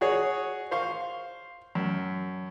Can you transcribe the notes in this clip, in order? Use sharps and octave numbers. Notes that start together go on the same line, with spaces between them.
F#4 G#4 C#5
C5 F5 C#6
F#2